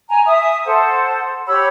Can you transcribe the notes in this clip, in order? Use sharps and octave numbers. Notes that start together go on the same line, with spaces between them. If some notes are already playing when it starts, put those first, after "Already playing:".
G#5 A#5
E5 D#6
A4 C5 F#5
G4 C#5 B5 E6